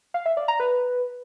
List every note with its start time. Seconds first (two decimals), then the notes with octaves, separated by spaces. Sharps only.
0.14 F5
0.26 E5
0.37 D5
0.48 A#5
0.60 B4